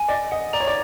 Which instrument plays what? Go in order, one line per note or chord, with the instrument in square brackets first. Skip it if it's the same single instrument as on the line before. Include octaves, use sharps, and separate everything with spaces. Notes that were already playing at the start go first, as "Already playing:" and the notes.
Already playing: [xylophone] G#5
[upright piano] D5 [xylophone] D#5
[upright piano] D#5 [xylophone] F#5
[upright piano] D5 [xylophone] A#5
[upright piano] C#5
D5